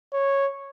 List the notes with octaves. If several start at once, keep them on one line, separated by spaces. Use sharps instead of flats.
C#5